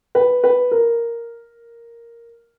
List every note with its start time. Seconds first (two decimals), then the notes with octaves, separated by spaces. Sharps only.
0.15 B4
0.44 B4
0.71 A#4